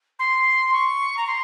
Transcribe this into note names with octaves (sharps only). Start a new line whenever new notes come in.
C6
C#6
A#5
C6